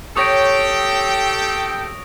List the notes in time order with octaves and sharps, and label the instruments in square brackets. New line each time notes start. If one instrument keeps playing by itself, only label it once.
[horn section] G4 A4 G5 [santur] C#5 [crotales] D#6 A#6 D7